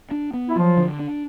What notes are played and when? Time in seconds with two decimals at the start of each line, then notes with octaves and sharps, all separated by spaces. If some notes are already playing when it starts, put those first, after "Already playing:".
0.11 D4
0.33 B3
0.49 E4
0.55 F3 F#3 F4
0.77 D3
0.99 D4